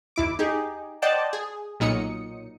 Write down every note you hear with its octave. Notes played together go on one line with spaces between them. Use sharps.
D#2 E4 D6
D#4 G4 G#4
C5 D5 D#5 F#5 G5 A5
G#4
B1 A#2 F#3 D#4 D#6 C#7